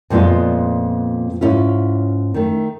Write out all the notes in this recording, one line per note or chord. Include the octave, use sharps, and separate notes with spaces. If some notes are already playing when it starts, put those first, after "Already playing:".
F2 A#2 G#3 B3 F4
G#2 C#4 E4 F4
D#3 A3